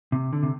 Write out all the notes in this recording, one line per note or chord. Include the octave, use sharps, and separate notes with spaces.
C3
D3
C3